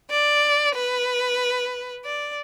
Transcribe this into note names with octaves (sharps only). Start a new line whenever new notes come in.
D5
B4
D5